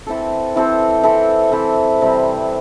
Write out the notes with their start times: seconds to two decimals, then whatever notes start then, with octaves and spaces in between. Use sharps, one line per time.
0.07 E3 C4 A4
0.56 E3 C4 A4
1.03 E3 C4 A4
1.52 E3 C4 A4
2.01 C3 G3 C4 G4